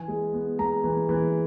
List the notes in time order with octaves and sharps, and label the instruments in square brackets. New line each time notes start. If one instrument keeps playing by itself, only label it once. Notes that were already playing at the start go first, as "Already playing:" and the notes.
Already playing: [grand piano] E3 G#5
G#3
B3
G#3 A#5
E3
E3